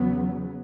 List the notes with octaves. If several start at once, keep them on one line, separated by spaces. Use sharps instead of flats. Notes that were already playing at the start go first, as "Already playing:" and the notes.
Already playing: E2 C#3 F#3 B3